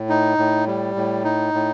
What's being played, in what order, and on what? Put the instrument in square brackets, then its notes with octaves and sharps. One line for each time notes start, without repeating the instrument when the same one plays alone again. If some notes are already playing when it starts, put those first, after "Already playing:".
Already playing: [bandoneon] A2
D#4
A2
G3
A2
D#4
A2